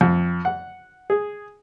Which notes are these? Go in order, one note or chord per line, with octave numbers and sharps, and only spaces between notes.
F2
F#5
G#4